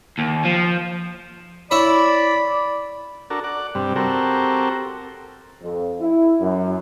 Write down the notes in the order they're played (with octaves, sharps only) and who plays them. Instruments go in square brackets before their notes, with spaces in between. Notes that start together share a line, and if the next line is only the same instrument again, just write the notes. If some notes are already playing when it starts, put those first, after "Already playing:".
[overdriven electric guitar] D#2
F3
[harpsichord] E4 C#5 [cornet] D5 [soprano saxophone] B5
[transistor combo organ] D4 F#4 A4 A#4
D5 F#5
G2 C3 G3
C4 F#4 G4 A4 A#4
[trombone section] F2
E4
F#2